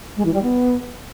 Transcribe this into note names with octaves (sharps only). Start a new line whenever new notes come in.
G#3
E3
G3
B3